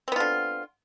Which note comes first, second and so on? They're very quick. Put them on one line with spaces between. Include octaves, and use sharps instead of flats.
C4 B3 F4 D3